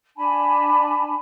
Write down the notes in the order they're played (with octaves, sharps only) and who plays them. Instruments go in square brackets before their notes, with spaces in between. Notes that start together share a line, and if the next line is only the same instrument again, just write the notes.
[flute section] D4 G#5 A5 B5